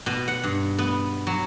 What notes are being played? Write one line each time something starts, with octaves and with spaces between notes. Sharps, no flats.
B2
F#5
G2
B3
F#3